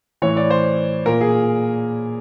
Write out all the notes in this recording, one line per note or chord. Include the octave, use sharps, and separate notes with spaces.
A2 E3 C#5
D5
C5
A#2 A#4
G#4